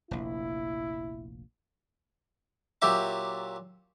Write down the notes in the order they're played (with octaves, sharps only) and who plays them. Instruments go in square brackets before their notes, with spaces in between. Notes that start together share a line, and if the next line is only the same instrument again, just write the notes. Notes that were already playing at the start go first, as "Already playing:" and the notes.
[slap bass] F1 A#1 [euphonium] E4
[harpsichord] A#2 F#3 G4 E5 D6